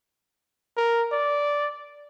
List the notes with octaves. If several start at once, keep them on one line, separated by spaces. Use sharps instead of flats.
A#4
D5